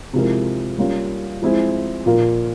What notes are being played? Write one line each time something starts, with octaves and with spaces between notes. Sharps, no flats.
C3 F3 G#3 E4 A#4
G3 A#3 C#4 F4
F3 G#3 C4 E4 G#4
A#2 F3 A#3 F4 A#4